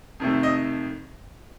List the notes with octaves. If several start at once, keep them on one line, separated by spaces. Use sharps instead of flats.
F2 C3 D#3 A3
D#5